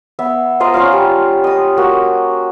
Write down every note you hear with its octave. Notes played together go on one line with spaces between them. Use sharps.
B3 E5
F4 C5 D#5 A#5
C#4 F4 D5 F5
G3
D#5 D#6
A#3 F#4